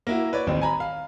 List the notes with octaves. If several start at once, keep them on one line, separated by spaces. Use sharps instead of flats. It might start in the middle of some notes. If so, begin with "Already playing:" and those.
A#3 E4 F#4
B4 C#5 D5
A1 D#2 C4
G#5 A#5 B5
F5